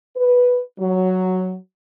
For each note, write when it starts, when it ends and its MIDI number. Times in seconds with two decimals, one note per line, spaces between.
0.16 0.60 71
0.79 1.55 54